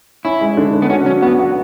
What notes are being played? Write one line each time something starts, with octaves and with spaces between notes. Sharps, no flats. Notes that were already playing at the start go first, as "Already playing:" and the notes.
C#4 E4
G#3
D3
D3
B3
C#4 F#4
F#3 C#4
B3 F#4
F#4